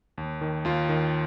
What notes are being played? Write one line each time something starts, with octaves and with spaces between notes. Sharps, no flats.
D#2
D#3
D#2 F4
D#3